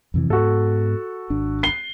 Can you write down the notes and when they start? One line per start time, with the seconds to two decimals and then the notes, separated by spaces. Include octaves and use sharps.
0.14 F2 C3 E3
0.30 G#2 B3 F#4 A4
1.30 G#1 D4
1.63 C7 G7